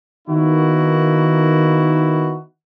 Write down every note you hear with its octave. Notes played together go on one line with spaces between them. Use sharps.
D#3 A#3 B3 D#4 E4 F#4